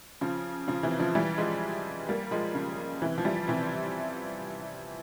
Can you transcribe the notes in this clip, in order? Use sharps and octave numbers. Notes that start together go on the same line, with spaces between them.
C#3 F3
C#3 F3
C3 E3
C#3 F3
E3 G3
F3 G#3
G3 A#3
F3 G#3
C#3 F3
C3 E3
F3
E3 G3
C3 E3